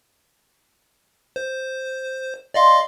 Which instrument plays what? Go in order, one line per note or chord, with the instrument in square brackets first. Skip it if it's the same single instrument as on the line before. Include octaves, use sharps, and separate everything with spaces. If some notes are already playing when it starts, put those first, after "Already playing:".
[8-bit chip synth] C5
[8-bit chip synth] D5 D#5 F5 [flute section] C6